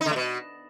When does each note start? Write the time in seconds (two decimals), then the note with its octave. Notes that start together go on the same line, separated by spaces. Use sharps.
0.01 D#4
0.06 D3
0.11 A3
0.16 B2